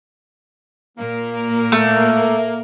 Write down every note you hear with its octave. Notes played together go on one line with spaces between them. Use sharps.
A#2 A#3 A#4
A3